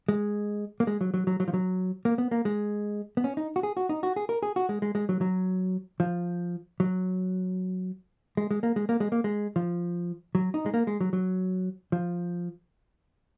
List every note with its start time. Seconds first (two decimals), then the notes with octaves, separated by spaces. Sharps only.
0.09 G#3
0.80 A#3
0.87 G#3
1.01 F#3
1.14 F#3
1.27 F#3
1.40 F#3
1.48 F3
1.54 F#3
2.05 A#3
2.18 B3
2.31 A#3
2.45 G#3
3.17 B3
3.24 C#4
3.37 D#4
3.56 F#4
3.63 G#4
3.77 F#4
3.89 D#4
4.03 F#4
4.16 G#4
4.29 A#4
4.43 G#4
4.56 F#4
4.69 G#3
4.82 G#3
4.95 G#3
5.09 F#3
5.21 F#3
6.00 F3
6.80 F#3
8.37 G#3
8.51 G#3
8.63 A#3
8.76 G#3
8.89 A#3
9.00 G#3
9.12 A#3
9.24 G#3
9.56 F3
10.35 F#3
10.54 D#4
10.66 G#3
10.74 A#3
10.87 G#3
11.01 F#3
11.13 F#3
11.92 F3